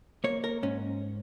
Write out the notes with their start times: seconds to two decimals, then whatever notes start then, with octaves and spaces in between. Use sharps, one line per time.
0.24 A#3 C#5
0.44 A#4
0.63 G#2 C#4